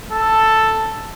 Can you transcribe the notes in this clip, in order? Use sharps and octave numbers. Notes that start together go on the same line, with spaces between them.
A4